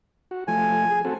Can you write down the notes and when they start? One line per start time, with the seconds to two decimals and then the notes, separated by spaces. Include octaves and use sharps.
0.31 F#4
0.48 F3 A3 G#5
0.90 G#4
1.05 C4 F#4 A4